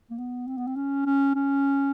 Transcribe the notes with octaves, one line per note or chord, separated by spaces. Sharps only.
A#3
B3
C4
B3
C4
C#4
C#4
C#4